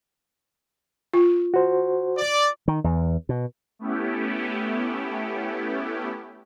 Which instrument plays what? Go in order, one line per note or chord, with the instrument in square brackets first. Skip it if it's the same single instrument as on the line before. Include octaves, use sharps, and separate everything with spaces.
[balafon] F4
[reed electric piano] F#4 C5
[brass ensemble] D5
[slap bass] D#3
E2
B2
[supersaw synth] A3 B3 C#4 E4 G4